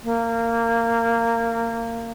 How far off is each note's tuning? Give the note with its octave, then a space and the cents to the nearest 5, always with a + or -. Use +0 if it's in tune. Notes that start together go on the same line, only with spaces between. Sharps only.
A#3 -20